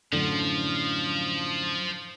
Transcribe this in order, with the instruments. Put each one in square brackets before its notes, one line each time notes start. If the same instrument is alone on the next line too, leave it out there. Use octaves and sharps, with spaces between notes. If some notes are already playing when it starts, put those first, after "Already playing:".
[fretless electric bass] F#2 A2 D3 [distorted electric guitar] F3